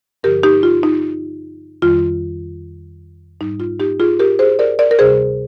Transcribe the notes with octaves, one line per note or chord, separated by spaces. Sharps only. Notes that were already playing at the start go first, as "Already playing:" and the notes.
G2 D3 F3 G4 A#4
D#4 G4
F4
D#4
F2 D#3 G3 F4
G#2 G3 D#4
F4
D#4 G4
F4 G#4
G4 A#4
G#4 C5
A#4 D5
A#4 D5
A#4
D2 C3 G3 G#4 C5